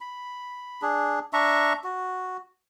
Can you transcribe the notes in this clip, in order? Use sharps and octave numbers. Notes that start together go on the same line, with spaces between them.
B5
D4 G#4
D4 E5 A#5 C#6
F#4